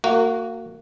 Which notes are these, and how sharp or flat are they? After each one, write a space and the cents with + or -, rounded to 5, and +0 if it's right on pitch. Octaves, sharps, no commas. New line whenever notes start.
A#3 -30 F#4 +0